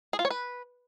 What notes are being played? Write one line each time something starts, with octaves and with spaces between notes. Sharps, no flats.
G#4
F4
C#5
B4